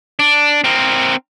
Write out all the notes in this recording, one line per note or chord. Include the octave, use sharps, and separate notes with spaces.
D4
C4 A#4